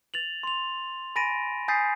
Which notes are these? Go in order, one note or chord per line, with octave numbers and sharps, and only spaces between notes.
A6 F7 F#7
C6 F7
G#5 B5 A6 A#6 D7 D#7
G#5 D#6 G6 A6 B6 C7